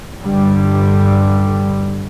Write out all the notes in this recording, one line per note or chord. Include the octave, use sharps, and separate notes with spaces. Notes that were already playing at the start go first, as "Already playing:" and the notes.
G2 D3 G3